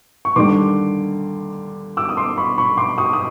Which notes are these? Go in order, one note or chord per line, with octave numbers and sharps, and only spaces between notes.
C#6
D#2 D3 G3 C6 D6
D6 E6
D#6
C6 D6
B5 C#6
B5 C#6
C6 D6
C#6 D#6
D#6